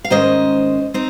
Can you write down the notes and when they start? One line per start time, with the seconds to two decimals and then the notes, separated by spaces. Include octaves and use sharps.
0.04 F5
0.10 G#2 D#3 G#3 C#4 C5 D#5
0.94 C4 D#4